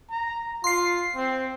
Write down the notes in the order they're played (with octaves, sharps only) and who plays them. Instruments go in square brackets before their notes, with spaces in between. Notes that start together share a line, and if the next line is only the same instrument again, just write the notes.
[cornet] A#5
[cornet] F4 [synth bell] C6 C7
[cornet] C4